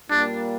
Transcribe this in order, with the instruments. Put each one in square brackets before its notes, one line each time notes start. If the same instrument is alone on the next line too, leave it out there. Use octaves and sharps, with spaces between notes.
[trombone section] A#2 G3 A#3 [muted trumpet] D4